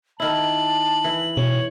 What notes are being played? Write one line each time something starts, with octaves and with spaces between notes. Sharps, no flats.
D#3 E4 A5 F#7
E3
B2 C#5